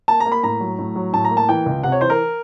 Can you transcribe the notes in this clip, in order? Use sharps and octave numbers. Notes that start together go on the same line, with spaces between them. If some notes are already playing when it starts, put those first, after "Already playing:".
A#3 A5
A#5
A#3
B5
A2 A#5
F#3
A2
F#3
A2 A5
A#5
A#3
A5
E3 G5
C#2
C3 F#5
C#5
E3 C5
A#4